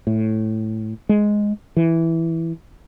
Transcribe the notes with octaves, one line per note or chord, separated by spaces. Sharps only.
A2
G#3
E3